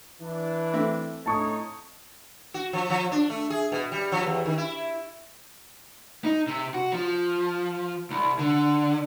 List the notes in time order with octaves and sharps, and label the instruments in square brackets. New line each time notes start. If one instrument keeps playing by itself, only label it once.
[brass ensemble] E3 D4
[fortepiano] A3 C4 E5
[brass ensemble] A2 D#4 C#5 [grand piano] A5 C#6 D#6
[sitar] F#4
F3
F3
D4
A3
G#4
B2
G3
F3
E2
D#3
E4
[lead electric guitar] D#4
C3
F#4
F3
C2
D3